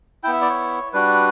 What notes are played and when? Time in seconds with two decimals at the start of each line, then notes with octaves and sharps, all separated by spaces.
0.23 B3 E4 G5
0.33 E5
0.41 D5
0.50 C#5
0.93 G3 D4 F#4 B4